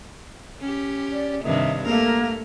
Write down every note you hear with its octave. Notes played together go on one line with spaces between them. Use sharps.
C#4 G4
D5
G2 C3 D#3 E5
A3 A#3 A#4